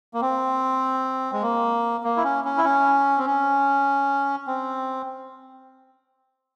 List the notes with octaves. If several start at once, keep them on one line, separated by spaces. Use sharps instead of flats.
A#3
C4
G#3
A#3
A#3
E4
C#4
C#4
E4
C#4
C4
C#4
C4